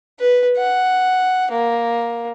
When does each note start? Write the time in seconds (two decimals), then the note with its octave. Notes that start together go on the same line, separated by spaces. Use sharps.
0.20 B4
0.58 F#5
1.51 A#3